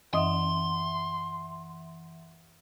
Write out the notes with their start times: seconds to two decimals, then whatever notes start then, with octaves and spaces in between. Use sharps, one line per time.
0.14 F#2 E3 D#5 E5 F#5 C6 D#6